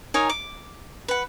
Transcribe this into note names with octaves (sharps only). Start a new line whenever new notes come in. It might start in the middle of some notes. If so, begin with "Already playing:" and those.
D#4 A#4 C#5 G#5
D6
B4 F#5